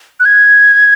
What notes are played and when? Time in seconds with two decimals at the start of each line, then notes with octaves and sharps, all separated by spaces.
0.20 F#6
0.25 G#6